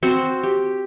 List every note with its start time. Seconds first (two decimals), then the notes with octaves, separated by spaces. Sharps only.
0.03 C4 F#4
0.43 G4